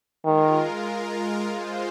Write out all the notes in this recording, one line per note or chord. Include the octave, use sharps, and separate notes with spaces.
D#3 G#3 F4 A#4
G#3 F4 C5